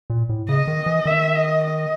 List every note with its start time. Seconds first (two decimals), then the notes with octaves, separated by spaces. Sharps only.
0.10 A#2
0.29 A2
0.49 C#3 D#5
0.67 D#3
0.86 E3
1.06 D#3 E5
1.35 D#5
1.64 D#5